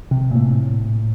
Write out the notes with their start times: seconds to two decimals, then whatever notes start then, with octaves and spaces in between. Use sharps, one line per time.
0.11 C3
0.31 A#2
0.35 A2